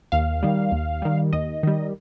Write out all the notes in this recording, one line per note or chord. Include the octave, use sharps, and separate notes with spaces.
D#2 F5
D#3 G3
D#2
D#3 G3
D#2 D#5
D#3 G3